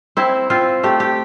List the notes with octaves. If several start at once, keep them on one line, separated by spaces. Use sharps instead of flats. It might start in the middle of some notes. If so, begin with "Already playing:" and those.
C4 E4
C4 F4
A3 G4
G4